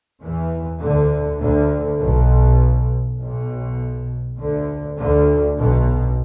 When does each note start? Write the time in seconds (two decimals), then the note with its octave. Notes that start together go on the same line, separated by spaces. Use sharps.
0.21 E2 E3
0.81 D2 D3
1.40 D2 D3
2.00 B1 B2
3.19 B1 B2
4.38 D2 D3
4.97 D2 D3
5.57 B1 B2